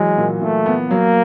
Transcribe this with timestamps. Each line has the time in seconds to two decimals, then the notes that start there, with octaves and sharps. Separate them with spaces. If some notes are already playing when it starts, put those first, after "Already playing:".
Already playing: E3 F#3 G#3
0.17 A#2
0.41 A#2 A3
0.66 B3
0.90 F#3 A#3